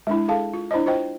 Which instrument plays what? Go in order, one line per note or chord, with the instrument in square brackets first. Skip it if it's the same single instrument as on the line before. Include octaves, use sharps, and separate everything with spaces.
[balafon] G#3 D4 E4
G#4 A4 F5 A5
F4
D4 E4 C5 D5 D#5
F4 C5 D#5 G5